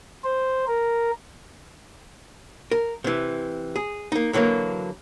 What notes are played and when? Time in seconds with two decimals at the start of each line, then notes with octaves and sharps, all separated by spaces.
0.24 C5
0.67 A#4
2.71 A#4
3.04 C3 E3
3.76 G#4
4.12 A#3 D#4
4.33 D3 E3 F#3 G#3 A#3